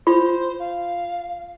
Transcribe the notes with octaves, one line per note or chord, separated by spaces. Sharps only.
F4 C5 B5
F5